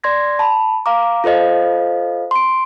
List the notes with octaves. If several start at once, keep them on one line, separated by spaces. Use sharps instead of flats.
D5 C6 G#6 A#6
A5 B5
F5 A#5 D6
F4 A4 C5 D#5 F5
C6 D7